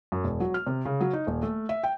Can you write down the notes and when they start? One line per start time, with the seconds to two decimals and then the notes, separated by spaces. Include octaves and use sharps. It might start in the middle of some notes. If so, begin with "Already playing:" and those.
0.12 F#2
0.24 E1
0.40 F#3
0.54 F6
0.67 C3
0.85 C#3
1.01 F#3
1.13 D#4
1.27 D#1
1.42 A3
1.69 E5
1.84 G5